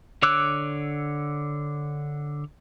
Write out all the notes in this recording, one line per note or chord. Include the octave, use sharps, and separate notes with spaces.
D3 C#5 D6 E6 F#6